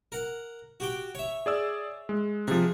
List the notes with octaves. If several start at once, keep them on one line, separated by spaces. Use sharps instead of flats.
A#4 F#5
F#4 G4 G5
C#5 E5
G#4 D5 E6
G#3
C3 F3 G#4